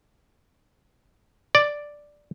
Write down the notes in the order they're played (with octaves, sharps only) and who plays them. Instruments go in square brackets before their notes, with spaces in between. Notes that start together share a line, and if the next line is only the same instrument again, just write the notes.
[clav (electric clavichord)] D5